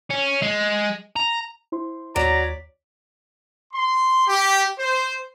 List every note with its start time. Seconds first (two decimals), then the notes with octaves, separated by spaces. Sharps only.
0.10 C#4
0.43 G#3
1.16 A#5
1.72 E4 C5 C6
2.16 D#2 F#3 C#5 D5 A#5 B6
3.74 C6
4.28 G4
4.79 C5